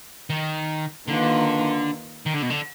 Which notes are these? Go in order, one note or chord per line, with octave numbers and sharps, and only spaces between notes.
D#3
D3 D#3 A#3 F4 B4
D#3
D3
B2
D3